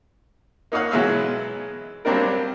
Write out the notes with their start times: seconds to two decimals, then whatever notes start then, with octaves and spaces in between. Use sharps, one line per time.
0.72 A#3 D#4 C#5 F5 F#5
0.91 B2 E3 F#3 G#3 E5 F5
2.05 F#3 G3 A#3 C4 D4 A#4